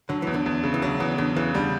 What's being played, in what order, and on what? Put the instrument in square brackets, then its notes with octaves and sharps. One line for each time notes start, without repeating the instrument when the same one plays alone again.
[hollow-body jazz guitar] D3 [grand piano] F#3
[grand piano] E2 [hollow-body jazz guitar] E3
[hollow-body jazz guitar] D3
[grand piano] E2
C#3
[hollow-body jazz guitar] E3
[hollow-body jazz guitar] D3 [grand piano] F#3
[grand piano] E2 [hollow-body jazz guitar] E3
[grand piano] E2 [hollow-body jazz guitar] D3
[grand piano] C#3 [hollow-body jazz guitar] E3
[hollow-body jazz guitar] D3 [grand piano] G3